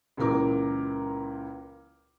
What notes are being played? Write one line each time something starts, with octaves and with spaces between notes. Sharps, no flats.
C#2 A#2 E3 A#4 D6